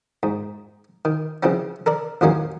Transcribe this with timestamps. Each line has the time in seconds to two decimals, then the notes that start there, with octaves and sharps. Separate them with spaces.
0.23 G#2
1.05 D#3
1.43 C#3 E3 F3 C4 C#4
1.86 A4 A#4 D5
2.21 A1 E2 D#3 F#3 A#3 C#4